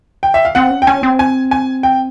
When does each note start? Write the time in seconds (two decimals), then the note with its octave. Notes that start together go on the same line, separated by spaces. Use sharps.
0.23 G5
0.34 E5
0.45 F5
0.55 C4 F#5
0.71 C#4
0.82 G5
0.87 C#4 G#5
1.03 C4
1.19 G#5
1.51 G#5
1.83 G5